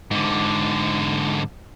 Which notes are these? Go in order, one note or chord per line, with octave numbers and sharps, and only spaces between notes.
G#2 D3